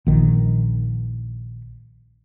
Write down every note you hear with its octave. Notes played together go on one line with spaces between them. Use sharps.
A#1 D#3